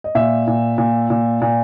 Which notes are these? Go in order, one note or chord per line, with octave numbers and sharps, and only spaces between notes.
D#5
A#2 E5
A#2
A#2
A#2
A#2